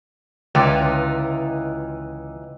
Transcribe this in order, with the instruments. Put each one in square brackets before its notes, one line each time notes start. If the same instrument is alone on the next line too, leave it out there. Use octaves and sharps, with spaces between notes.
[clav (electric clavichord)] C#2 [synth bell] D3 A6 [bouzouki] E3 D#4 F4 [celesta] G5 D6